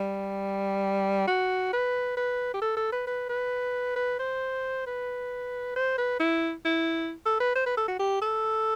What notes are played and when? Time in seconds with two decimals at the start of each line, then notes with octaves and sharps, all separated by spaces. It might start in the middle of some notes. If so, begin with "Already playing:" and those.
Already playing: G3
1.27 F#4
1.73 B4
2.17 B4
2.54 G4
2.62 A4
2.77 A4
2.92 B4
3.07 B4
3.29 B4
3.96 B4
4.19 C5
4.87 B4
5.76 C5
5.98 B4
6.20 E4
6.65 E4
7.26 A4
7.40 B4
7.55 C5
7.66 B4
7.77 A4
7.88 F#4
7.99 G4
8.22 A4